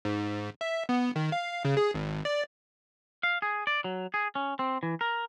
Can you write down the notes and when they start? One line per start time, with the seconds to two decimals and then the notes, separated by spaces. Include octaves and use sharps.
0.05 G#2
0.61 E5
0.89 B3
1.16 D#3
1.32 F5
1.65 C#3
1.77 G#4
1.94 G#1
2.25 D5
3.23 F5
3.42 G#4
3.67 D5
3.84 F#3
4.14 G#4
4.35 C#4
4.59 C4
4.83 E3
5.01 A#4